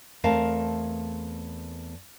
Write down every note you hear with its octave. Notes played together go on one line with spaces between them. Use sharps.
E2 A3 C4 A#4 F5 A5